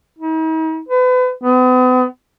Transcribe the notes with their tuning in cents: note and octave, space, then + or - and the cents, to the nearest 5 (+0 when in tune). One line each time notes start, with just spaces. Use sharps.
D#4 +45
B4 +35
B3 +40